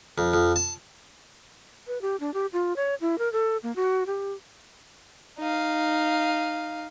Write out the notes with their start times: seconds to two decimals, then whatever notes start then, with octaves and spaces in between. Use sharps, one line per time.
0.18 F2
0.34 F2
0.56 A5
1.87 B4
2.01 G4
2.20 D4
2.34 G4
2.53 F4
2.76 C#5
3.01 E4
3.18 A#4
3.33 A4
3.63 A#3
3.76 F#4
4.07 G4
5.39 D#4 F5